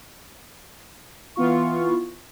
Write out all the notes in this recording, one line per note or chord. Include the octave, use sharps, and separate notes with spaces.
E3 B3 F4 C#6